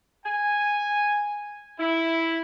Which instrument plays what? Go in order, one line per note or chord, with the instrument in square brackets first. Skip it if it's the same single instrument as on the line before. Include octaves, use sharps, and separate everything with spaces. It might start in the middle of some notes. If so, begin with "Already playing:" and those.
[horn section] G#5
E4